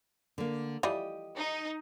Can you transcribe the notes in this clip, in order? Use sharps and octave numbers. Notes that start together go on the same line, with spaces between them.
D3 A#3
E3 F3 G3 G4 D#5
D#4